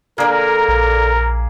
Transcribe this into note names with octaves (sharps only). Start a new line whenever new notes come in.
D3 A#3 D4 G#4 A#4
A#1